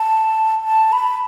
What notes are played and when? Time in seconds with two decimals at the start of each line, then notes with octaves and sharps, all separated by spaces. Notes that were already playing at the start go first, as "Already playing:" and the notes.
Already playing: A5
0.65 A5
0.93 B5